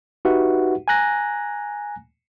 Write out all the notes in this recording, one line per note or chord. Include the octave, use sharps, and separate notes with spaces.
D#4 F#4 G4 B4 E5 F#5
G#5 A#5 F#6 A#6